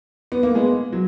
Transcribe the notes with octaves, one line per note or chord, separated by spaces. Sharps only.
B3
A#3
G#3 B3
F#3